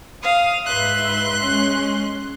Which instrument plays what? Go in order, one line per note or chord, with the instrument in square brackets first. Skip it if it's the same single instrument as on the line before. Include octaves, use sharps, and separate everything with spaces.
[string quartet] F5 D#6
[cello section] G#2 B4 E5 [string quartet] C6 F#6
[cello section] G#3 C#4